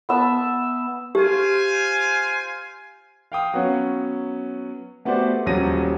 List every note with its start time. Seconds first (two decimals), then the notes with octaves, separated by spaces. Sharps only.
0.09 B3 E5 A5
1.15 F4 G4 C5 G#5
3.32 F5 G5 D#6
3.54 F#3 B3 C#4
5.05 A3 B3 F#4 G4 C5 D5
5.46 D#1 F3 F#3 C#4 A#6 D#7